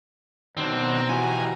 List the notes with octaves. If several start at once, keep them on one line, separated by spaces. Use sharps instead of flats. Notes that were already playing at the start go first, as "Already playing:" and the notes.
B2 D#3 F#3 C4 D4 A#5
E3 F#4 G4 G#5